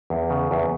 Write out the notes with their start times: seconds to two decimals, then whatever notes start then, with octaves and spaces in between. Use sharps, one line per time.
0.10 E2
0.30 C#3
0.51 E2